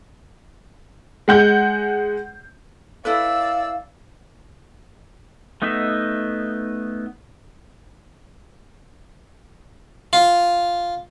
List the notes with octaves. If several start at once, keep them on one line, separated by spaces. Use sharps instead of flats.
G#3 F#5 G6
E4 A4 B4 D5 F5 E6
A3 B3 D#4 D#5 E5
F4